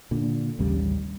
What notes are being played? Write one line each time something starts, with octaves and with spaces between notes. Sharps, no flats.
A#2 D3
A1 D#2 C#3 G3